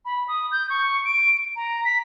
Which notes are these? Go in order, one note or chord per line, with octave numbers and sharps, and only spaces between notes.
B5
D#6
G6
C#6
D7
A#5
B6